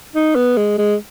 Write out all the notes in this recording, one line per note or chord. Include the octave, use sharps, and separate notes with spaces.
D#4
B3
G#3
G#3